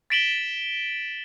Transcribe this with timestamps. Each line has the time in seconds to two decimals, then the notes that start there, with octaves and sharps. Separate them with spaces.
0.10 A6 B6 D7 E7 F#7 G7